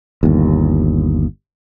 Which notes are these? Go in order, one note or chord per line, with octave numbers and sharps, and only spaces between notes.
G1 D#2